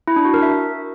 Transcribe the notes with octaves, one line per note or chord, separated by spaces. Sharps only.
E4
D4
F#4
A#4
E5